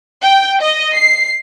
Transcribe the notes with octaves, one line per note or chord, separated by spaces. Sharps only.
G5
D#5
C7